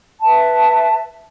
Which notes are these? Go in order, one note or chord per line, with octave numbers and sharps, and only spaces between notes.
B4 E5 A5